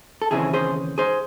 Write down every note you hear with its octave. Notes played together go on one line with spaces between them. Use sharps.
A4
D#2 C#3 E3 C4 E4 G#4
G#4 C5
G#4 C5